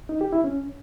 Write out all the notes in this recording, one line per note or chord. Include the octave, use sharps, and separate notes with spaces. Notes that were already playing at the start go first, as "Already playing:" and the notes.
D#4
G4
E4
C#4